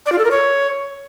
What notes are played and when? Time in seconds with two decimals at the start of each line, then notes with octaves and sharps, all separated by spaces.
0.06 D5
0.12 F4
0.18 A4
0.25 A#4
0.31 C#5